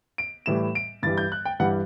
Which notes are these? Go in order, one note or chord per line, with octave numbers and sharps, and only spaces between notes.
D7
A2 E3 G3 E7
D7
G2 E3 G3 A6
G6
F#6
G5
G2 E3 G3 F#5